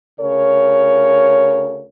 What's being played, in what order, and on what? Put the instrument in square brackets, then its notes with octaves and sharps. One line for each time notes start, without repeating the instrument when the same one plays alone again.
[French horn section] D2 C#3 A#4 C#5